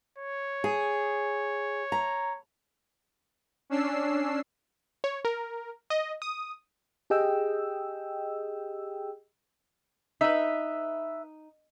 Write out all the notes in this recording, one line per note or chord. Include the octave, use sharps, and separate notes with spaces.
C#5
G#4
A#5
C#4 D4 E6 C7
C#5
A#4
D#5
D#6
G4 G#4 D#5 G5 E6
D#4 B4 E5